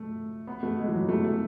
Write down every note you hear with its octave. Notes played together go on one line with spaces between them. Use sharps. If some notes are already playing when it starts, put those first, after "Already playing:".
Already playing: A3
B3
A3
G#3
E3
F#3
A3
A3